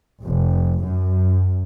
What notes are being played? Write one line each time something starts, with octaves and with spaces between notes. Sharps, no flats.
F1
F#2